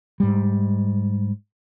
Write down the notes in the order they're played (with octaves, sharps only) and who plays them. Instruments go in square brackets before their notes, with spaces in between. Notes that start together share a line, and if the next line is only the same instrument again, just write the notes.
[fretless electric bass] G#2 G3